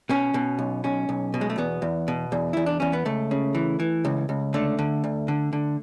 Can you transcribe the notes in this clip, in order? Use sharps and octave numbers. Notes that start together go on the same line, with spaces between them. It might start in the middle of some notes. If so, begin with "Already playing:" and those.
B2 C#4
B2
B1
B1 C#4
B1
B2
G#3
A3
E2 B3
E2
B2
E2
E2 E4
D4
E2 C#4
B3
C#2 A3
C#3
E3
E3
C#2
C#2
D3 A3
D3
D2
D3
D3